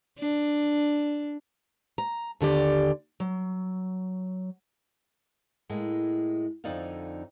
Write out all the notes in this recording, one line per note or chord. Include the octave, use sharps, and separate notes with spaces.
D4
A#5
D#2 D3 G4 D5
F#3
A2 G#3 A#3
F2 D3 D#4 D5 D#5 F5